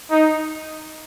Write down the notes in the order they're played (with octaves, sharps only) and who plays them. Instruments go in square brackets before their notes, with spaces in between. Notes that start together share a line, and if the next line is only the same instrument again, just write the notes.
[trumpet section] D#4